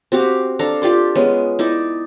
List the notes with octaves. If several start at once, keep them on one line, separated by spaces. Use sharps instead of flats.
C4 F#4 G4 F5
D4 A4 F5 A#5
F4 G4 D5 C6
G#3 B3 C#4
D#4 E4 D5